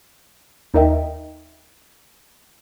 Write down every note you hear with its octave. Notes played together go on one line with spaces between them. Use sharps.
D#2 D#4 A#4 D#5 E5 G5